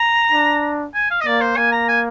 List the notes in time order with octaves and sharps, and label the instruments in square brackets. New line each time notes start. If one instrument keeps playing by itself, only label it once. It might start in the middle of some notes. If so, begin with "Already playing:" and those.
Already playing: [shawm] A#5
[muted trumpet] D4
[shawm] G#5
F5
D#5
[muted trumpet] A#3 [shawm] D5
[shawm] C5
[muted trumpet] A#3 [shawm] G#5
[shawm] A#5
G#5